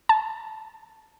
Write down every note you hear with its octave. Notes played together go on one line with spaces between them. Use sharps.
A5